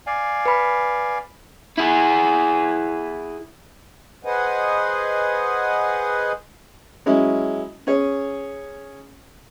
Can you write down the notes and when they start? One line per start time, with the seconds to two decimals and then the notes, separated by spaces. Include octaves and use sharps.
0.07 D5 F5 G#5
0.46 B4 B5
1.78 E4 G#4
4.25 G#4 B4 C5 D#5 F#5 G#5
7.06 F#3 G#3 C#4 E4
7.87 C#4 G#4 C#5